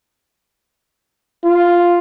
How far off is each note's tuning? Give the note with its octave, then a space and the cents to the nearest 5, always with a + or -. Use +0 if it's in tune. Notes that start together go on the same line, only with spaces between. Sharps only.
F4 +0